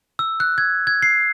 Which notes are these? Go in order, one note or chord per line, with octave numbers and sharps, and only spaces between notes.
E6
F#6
G#6
G#6
C7